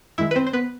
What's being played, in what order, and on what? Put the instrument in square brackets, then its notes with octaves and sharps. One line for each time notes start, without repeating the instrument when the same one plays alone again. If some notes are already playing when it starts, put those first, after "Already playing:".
[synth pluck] F#2 D#3 G#3 E4 E5
B4
C4 C5
C5
B3 B4